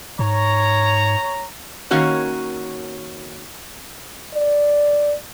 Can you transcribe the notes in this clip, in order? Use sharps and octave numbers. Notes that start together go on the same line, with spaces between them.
G#2 C#5 A#5
D#3 A#3 C#4 F#4 C#5
D5